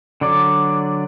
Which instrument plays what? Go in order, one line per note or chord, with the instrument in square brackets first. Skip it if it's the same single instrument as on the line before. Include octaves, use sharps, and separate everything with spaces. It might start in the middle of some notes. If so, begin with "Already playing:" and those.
[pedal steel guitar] D3 F#3 D5